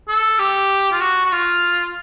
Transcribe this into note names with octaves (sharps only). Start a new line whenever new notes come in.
A4
G4
F4
F#4
F#4
F4